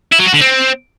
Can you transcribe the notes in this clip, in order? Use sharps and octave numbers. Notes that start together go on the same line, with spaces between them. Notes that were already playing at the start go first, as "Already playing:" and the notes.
E4
F#3
F#4
D3
C4